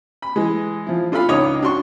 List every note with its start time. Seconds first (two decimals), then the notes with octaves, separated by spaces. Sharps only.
0.22 B5
0.36 E3 G#3
0.87 F3 E4
1.12 D4 F4 A4 F5 B5
1.29 C#2 D#4 C#5 D#5 D6 D#6
1.62 D4 F#4 C6 C#6